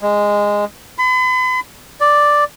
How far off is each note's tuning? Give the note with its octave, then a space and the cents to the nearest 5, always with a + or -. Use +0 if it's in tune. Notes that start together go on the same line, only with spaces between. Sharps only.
G#3 -10
B5 +45
D5 +0